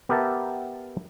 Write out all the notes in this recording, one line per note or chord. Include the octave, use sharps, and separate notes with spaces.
B3 G4 A#4 E5 A5